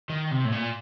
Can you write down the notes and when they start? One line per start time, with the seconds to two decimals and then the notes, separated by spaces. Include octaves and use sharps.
0.09 D#3
0.31 C3
0.45 A2
0.52 A#2